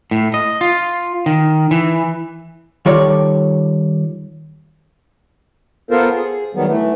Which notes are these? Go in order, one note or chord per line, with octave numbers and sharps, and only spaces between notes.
A2
D#5
F4
D#3
E3
D#3 G3 F4 A4 C#5 D5
B3 F4 A4 A#4 C5
G#4
D#3 F#3 G3 B3
E3 A3